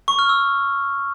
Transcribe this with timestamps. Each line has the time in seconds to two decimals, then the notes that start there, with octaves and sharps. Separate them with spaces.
0.08 C#6
0.19 F6
0.29 E6